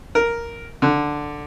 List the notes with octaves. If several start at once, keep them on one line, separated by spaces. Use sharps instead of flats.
A#4
D3